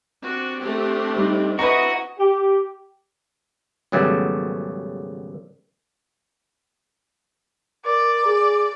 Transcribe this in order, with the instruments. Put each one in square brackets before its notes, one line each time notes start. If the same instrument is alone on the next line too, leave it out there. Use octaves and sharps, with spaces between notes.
[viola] C4 D4 [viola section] F#4
[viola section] A3 G4
[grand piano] G3 D#4
[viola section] E4 D#5 [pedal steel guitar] F#4 [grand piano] B4 A#5
[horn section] G4
[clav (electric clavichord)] G#1 C#3 F#3 G3 A3 B3
[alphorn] A#4 [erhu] D5
[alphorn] G#4